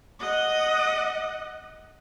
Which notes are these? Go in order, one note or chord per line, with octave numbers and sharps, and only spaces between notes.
D#5 F#5